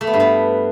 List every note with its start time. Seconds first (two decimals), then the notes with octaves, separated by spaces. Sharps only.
0.01 A3
0.07 B3
0.13 G2
0.20 B3